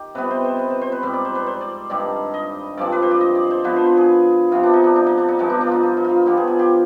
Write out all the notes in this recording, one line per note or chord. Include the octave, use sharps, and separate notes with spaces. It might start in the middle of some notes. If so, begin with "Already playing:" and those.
Already playing: D#3 G4
C3 G3 B3 B4
C5
C5
B4
C5
C5
B4
G#2 G3 C4 B4
D5
C5
B4
C5
D5
G2 D#3 G3 D5
D#5
G2 F3 G#3 C4 D5
B4
C5
D5
D#5
D5
C5
D3 F3 B3 B4
C5
B4
G#4
C3 F3 B3 F4
D4
D#4
D4
D4
D#4
D4
D#4
G2 F3 G#3 B3 D#4
D4
D4
D#4 F4
D#4
D#4
F4
D3 F3 B3 G4
G#4
G#4
G4